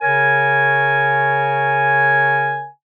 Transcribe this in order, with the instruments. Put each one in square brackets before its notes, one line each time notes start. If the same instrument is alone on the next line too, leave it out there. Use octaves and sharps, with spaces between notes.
[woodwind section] C#3 A#4 C#5 G#5